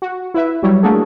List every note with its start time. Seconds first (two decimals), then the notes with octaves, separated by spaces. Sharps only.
0.02 F#4
0.34 E4 B4 E5
0.63 F#3 G3 E4 C#5
0.82 A3 A#3 D4 F#4 G#4 A4